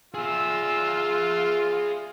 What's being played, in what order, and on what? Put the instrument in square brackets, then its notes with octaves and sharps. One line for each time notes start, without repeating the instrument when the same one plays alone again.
[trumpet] F4 [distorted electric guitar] G#4 E5 [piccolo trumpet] E6